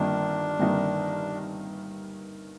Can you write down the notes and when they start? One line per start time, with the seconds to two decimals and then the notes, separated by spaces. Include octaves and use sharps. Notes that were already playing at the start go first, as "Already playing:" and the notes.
Already playing: G1 G2 D#3 A#3 D4 D#4
0.59 G1 G2 D#3 A#3 D#4